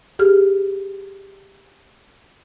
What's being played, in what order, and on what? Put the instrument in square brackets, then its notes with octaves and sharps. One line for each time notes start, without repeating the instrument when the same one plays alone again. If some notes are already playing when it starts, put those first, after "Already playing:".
[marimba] G4 G#4 F6